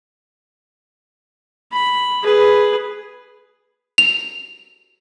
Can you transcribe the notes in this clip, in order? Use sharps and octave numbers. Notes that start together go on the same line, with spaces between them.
B5
G#4 B4
F7